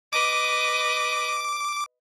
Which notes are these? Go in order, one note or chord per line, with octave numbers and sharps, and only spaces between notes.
B4 D#5 D6